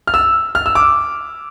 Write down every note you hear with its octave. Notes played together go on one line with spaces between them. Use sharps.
F6
E6
F6
E6
D6